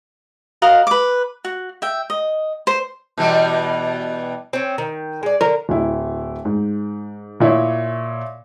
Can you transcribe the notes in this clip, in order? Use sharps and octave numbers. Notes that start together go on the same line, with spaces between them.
F#4 A#4 D#5 F5
B4 D6
F#4
E5 G5
D#5
C5
B2 E3 G3
C4 C#4
D#3
G#3 D5
D3 A#4
D1 E4
G#2
A#2 E4 C#5